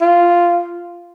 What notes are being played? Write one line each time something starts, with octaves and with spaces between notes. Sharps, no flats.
F4